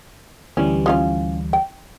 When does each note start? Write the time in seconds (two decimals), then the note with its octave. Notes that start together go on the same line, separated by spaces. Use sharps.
0.57 D2 E3 G3 C#4
0.86 F3 C#4 F4
1.53 G5